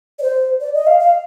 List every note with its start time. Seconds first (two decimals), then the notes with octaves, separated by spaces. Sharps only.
0.19 D5
0.22 C5
0.61 D5
0.74 D#5
0.87 F5
0.99 F5